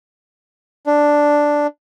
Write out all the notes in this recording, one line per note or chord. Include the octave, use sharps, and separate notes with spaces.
D4